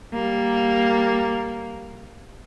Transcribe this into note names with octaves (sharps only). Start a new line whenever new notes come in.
G3 A#3